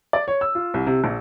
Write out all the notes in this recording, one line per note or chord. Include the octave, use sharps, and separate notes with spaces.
D5
C#5
E6
F4
C2
C3
A#1